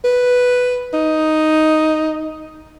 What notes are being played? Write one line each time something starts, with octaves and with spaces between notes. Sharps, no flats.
B4
D#4